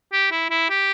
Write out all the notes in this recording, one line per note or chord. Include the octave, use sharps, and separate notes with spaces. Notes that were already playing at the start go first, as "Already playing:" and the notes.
G4
E4
E4
G4